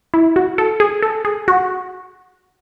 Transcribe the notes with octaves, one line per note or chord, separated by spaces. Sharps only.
E4
F#4
A4
G#4
A4
G#4
F#4